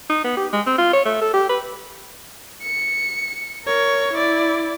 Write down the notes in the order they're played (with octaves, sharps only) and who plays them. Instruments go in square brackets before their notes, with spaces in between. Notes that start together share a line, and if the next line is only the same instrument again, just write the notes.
[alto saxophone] D#4
B3
G4
G#3
C4
F4
C#5
A3
A4
G4
B4
[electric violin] C#7
A#4 C#5
E4 D5